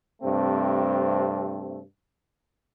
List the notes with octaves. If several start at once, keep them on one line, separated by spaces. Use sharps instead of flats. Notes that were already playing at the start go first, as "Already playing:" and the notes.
G2 C3 A3 C4